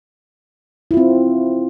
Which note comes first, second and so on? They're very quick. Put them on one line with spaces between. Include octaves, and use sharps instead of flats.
E4 F4 C4